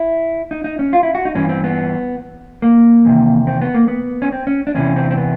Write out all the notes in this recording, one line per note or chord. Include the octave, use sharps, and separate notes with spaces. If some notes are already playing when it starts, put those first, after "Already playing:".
Already playing: E4
D#4
D#4
C#4
F4
E4
F#4
D#4
G2 E3 C#4
C4
B3
A#3
E2 C3 D#3
C4
B3
A#3
B3
C#4
C4
C#4
D4
E2 C3 E3 C#4
C4
C4
B3